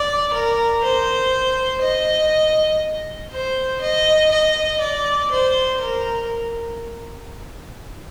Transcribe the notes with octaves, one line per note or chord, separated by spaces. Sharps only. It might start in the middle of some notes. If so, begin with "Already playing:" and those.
Already playing: D5
A#4
C5
D#5
C5
D#5
D#5
D5
C5
A#4